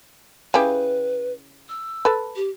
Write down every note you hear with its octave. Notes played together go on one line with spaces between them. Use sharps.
C#3 E4 G4 B4
E6
A4 B4
G4